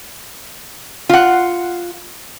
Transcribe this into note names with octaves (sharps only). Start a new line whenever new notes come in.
F4 F#5